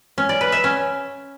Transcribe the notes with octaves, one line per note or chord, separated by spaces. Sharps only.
C#4
D5
B4
E5
C#4